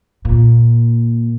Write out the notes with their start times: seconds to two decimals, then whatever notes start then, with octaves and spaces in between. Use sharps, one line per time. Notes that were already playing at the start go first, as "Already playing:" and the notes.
0.25 A#2